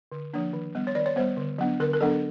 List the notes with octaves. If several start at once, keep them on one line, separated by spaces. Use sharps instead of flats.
D3
F3 A#3 D4
D#3
G3 B3
C#5
D#3 D5
C#5
G3 B3 C5
D3
F#3 B3 D4
D3 A#4
A#4
F#3 B3 D4 A4